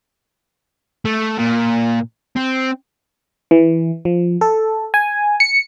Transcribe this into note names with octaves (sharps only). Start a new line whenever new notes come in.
A3
A#2
C4
E3
F3
A4
G#5
C#7